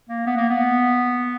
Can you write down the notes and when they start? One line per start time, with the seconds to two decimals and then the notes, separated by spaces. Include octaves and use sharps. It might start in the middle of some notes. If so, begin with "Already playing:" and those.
0.09 A#3
0.26 B3
0.37 A#3
0.49 B3